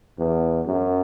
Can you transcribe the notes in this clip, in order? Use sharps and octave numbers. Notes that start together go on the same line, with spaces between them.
E2
F#2